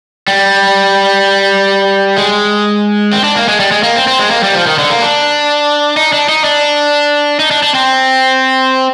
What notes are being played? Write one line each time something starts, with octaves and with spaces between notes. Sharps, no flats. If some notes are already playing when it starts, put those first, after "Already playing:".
G3
G#3
C4
D4
A#3
G#3
G3
G#3
A#3
C4
C4
G#3
A#3
G3
F3
D#3
D3
A#3
D4
D#4
D4
D#4
D4
D#4
D4
D4
C4